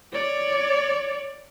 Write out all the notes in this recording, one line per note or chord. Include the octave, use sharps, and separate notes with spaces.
C#5 D5